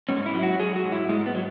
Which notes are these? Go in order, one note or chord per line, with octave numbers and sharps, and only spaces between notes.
G#2 C#4
E4
F#3
F#4
F#3 G#4
F#4
G#2
E4
G#2 G#3
B3
F#3